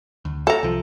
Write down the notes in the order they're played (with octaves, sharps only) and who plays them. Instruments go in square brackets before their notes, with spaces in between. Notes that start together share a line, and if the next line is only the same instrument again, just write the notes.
[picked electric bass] D2
[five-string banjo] A4 A#5
[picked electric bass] C2 F3